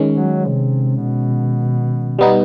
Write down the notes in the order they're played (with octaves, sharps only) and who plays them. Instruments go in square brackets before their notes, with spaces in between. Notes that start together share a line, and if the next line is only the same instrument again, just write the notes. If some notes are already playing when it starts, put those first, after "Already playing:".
Already playing: [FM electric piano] D#3 G#3 C#4
[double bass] F#3
C3
B2
[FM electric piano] G3 B3 D#4